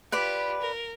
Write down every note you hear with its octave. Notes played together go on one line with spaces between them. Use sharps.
F4 G4 B4 D5 B5
A#4